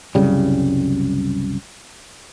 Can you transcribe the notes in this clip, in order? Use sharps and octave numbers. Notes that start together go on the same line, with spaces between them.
C2 F#2 C#3 G3